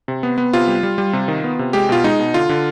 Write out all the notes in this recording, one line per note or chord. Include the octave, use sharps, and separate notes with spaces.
C3
B3
B3
C3 F4
G3
G3
G3
C3
D#3
B3
C3
G#3 G4
B2 F4
G#3 D#4
B2
D3 F4
D3